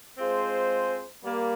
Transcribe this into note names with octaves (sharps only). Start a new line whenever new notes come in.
G#3 C4 F4 G#4 C5
G3 A#3